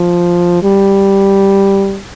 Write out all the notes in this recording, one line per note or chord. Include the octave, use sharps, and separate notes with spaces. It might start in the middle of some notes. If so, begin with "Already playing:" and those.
Already playing: F3
G3